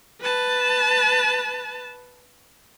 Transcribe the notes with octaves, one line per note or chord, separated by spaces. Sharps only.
B4 A5